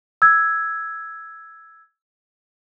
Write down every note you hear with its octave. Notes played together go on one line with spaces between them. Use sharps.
E6 G#6